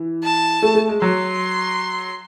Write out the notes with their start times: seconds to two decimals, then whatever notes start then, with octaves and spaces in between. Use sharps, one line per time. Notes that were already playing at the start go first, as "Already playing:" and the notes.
Already playing: E3
0.23 A5
0.62 A3
0.75 A3
0.89 G#3
1.01 F#3 C6